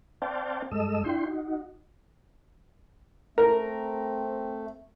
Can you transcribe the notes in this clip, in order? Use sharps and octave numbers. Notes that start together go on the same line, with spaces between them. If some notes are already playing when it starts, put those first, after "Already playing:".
C4 C5 D5 F5 G5 A5
G2 G#3 A4 D#5 E6
D4 E4 F4 G5 C6
D#4 F#4
A3 C4 A#4